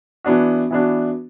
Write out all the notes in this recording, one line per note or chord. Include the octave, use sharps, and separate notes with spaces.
E3 B3 D4 F#4
E3 B3 D4 F#4